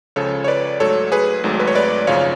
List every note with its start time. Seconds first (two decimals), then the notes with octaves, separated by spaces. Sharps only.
0.16 C#2 C#3 F3 A4 C#5
0.44 C#5
0.48 B4 D5
0.80 G#2 F#3 A3 A4 C#5
1.12 G#4 B4
1.44 G#1 G#2 F#3 A3
1.60 B4
1.67 C#5
1.75 B4 D5
2.07 G#1 F#2 C#3 F3 C#5 F5